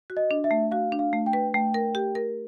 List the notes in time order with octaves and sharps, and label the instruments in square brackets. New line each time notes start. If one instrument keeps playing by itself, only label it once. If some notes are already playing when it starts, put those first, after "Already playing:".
[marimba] F#4
[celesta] D#5
[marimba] D4
[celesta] E5
[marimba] A3
[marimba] F#4 [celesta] F5
[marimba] D4
[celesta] F5
[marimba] A3
[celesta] G5
[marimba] B4
[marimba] A3 [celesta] G5
[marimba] A#4
G4
A#4